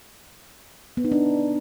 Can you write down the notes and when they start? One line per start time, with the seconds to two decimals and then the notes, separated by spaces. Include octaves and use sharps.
0.97 B3
1.04 D#4
1.12 D4